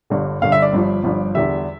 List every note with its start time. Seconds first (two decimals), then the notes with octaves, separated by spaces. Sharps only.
0.10 G1 G2 D3
0.42 G1 G2 D3 F5
0.52 E5
0.62 D5
0.73 G1 G2 F3
1.04 G1 G2 F3
1.35 E2 D3 G3 E5